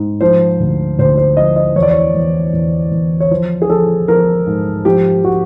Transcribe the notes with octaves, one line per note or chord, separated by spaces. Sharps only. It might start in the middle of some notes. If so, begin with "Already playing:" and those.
Already playing: G#2
F3 C5
D2
D2 C5
C5
F3 D#5
D#5
E2 C#5
D5
C#5
E2
E2
E2
C#5
F3 C5
G#4
F3 A4
F3 A#4
G#2
F3 G4
F3 F#4